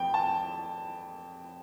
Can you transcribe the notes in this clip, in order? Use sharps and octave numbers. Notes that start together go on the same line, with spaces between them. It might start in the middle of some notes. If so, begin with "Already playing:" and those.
Already playing: F2 G5
A5